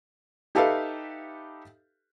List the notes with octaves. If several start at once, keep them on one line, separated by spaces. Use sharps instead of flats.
D#4 G4 A4 B4 E5 F5